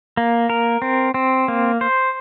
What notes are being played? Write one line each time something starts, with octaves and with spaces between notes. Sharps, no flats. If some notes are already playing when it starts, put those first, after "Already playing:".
A#3
A#4
C4
C4
A#3
C5